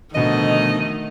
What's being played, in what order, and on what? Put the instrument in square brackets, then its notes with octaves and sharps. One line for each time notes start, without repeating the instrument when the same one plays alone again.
[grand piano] B2 D3 F3 [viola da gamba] D#3 A3 [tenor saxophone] D#5